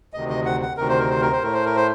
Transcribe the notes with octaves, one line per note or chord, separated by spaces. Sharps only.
D2 C3 D#3 D#5
D#5
F#5
F#5
D2 C3 D#3 A#4
C5
A#4
C5
A#4
C5
A2 A3 A#4
C5
A#4
C5